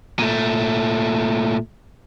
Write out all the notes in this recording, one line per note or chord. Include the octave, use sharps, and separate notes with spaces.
A#2 A3